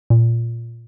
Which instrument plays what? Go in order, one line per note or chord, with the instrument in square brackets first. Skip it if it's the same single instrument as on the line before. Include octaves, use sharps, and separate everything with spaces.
[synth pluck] A#2